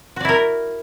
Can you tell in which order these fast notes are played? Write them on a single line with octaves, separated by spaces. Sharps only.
F#4 D5 E4 A#4